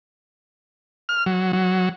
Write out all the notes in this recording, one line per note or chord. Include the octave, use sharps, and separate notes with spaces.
F6
F#3
F#3